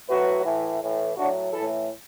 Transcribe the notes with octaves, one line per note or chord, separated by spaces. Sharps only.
A2 F#3 F#4 B4
A2 E3
A2 E3
A2 F#3 D4 F#4
A2 E3 E4 A4